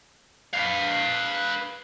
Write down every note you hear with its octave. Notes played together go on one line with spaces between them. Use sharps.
B4 F5